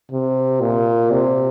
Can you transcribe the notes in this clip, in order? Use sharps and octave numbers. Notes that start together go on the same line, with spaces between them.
C3
A#2
C3